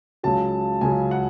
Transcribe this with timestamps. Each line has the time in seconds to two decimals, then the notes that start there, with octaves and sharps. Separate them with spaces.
0.23 C#2 C#3 F#3 A5
0.81 C#2 C#3 F#3 G#5
1.11 F#5